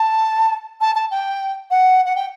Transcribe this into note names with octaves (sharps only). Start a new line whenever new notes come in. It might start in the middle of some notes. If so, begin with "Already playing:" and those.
Already playing: A5
A5
A5
G5
F#5
F#5
G5